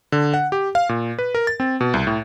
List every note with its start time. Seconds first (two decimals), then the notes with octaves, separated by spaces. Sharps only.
0.12 D3
0.34 F#5
0.52 G4
0.75 F5
0.89 A#2
1.19 B4
1.35 A#4
1.47 A6
1.60 C4
1.81 B2
1.94 C2
2.07 A2